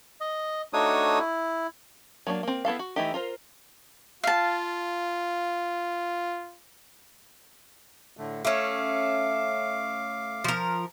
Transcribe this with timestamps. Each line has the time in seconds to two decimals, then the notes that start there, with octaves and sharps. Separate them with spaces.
0.21 D#5
0.73 A3 D4 D#4 F#4 C#5 D#6
1.19 E4
2.27 F#3 A#3 D4
2.43 A#3 C4
2.65 B3 E4 A4 F5
2.79 F#4
2.96 E3 A3 D#4 E4 G4
3.14 F4 A#4 C5
4.24 F4 F5 A5
8.17 A2 D3 A3
8.45 A3 C#4 F5 D6
10.44 F3 A#4